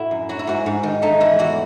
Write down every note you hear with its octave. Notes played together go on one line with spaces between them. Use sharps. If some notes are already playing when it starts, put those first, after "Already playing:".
Already playing: A2 E4 F#4
F#2
F#3 F#4
E4
G#2 F#4
G#2
D#3
A3 D#4
E3 E4
E2 F#4